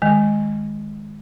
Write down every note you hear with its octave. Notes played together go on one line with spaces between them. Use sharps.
D#3 G#3